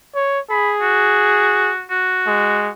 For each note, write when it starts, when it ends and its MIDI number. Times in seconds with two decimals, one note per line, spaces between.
0.15 0.40 73
0.51 1.72 68
0.51 0.72 83
0.82 1.83 66
1.90 2.70 66
2.27 2.70 56